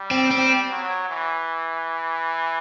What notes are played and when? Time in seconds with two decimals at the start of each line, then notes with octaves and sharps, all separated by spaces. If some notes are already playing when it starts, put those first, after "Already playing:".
Already playing: G3
0.11 C4
0.31 C4
0.70 F#3
1.09 E3